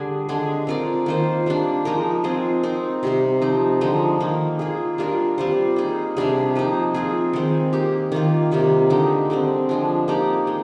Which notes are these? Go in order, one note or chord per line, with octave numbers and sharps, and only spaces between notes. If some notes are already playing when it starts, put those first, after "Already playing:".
Already playing: D3 G3 D4 G#4
D3 G#3 D4 G#4
C4 F4 A#4 D5
D#3 A#3 F4 C5
G3 A#3 D4
F3 G#3 D#4 A#4
G#3 C4 F4 G#4
C4 D#4 A#4
C3 G3 C4
F3 C4 D#4
D3 F3 G#3 D#4
D#3 A#3 D#4 A#4
A#3 F4 G#4
G3 D4 F4 A#4
G3 C4 F4 C5
A#3 D#4 G#4
C3 G3 D4 G#4
F3 A#3 D#4
C4 F4 G#4
D#3 G#3 C4
A#3 D#4 G4
D#3 A#3 F4
C3 D#3 G3 A#3
D3 G#3 D#4 G4
D3 G3 C4
D3 F3 G#3 D4
A#3 D#4 G4 D5
G#3